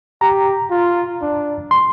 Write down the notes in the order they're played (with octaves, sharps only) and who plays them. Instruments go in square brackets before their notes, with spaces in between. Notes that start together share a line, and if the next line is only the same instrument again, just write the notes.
[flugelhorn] G4 [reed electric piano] A#5
[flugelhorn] F4
D4
[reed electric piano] C6